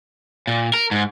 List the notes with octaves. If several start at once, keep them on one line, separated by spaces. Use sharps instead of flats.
A#2
A#4
G#2